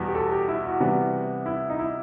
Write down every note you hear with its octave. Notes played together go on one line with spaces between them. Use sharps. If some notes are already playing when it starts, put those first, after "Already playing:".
Already playing: E2 B2 G3 B3
G4
A4
G4
E4
F#4
C3 E3 G3 B3
E4
D#4
E4